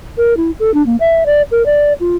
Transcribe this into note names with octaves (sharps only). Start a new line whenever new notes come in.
A#4
E4
A4
D4
A#3
E5
D5
A#4
D5
F4